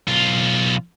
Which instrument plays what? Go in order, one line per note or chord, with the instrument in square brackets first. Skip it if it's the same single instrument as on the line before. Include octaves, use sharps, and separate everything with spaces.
[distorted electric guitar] B1 F4